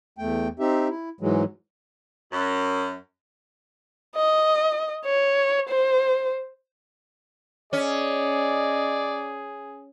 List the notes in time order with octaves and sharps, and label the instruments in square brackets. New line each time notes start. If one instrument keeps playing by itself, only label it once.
[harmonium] E2 A3 G5
C4 D#4 G4 E5
E4
G#2 E3 F#3 G#3
[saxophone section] F#2
[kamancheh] D#5
C#5
C5
[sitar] C#4 [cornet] G#4 [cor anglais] D5 [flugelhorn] D#5